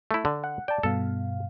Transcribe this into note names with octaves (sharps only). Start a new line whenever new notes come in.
A3 E4
D3
F#5
D5 G5 A5
G2 B2 A4 F5